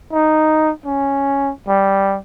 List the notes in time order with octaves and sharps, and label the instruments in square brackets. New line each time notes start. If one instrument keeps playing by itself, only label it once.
[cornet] D#4
C#4
G3